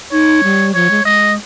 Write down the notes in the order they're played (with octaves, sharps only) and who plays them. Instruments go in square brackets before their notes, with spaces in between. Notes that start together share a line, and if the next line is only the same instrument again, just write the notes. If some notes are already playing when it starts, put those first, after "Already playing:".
[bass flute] D#4 [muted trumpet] C#5
[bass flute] G3
[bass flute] F3 [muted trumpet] C#5
[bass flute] G#3
[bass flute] G#3 [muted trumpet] D#5